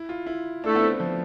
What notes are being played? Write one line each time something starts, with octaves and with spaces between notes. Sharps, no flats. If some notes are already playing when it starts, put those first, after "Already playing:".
Already playing: E4
F4
E4
A3 D4 E4 A4
B3
C4
F3